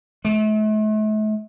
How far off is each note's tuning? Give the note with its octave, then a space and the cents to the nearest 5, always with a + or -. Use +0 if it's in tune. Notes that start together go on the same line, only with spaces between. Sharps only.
A3 -40